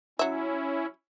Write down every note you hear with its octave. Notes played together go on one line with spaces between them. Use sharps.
F#3 C#4 E4 E5